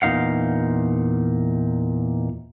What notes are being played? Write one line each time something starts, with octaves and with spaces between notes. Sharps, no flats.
E2 A#2 D#4 F5 F#5